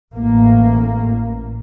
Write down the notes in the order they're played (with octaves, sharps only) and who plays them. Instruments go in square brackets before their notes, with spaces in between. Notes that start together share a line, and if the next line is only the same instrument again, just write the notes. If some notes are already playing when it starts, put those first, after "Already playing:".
[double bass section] A1 A#3